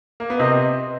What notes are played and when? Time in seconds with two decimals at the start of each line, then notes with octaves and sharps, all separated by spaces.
0.20 A#3
0.30 B3
0.39 C3 C4 D#5